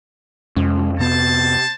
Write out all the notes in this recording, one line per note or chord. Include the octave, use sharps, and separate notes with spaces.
F2 C3 G#3 C#4
C3 B3 C5 A5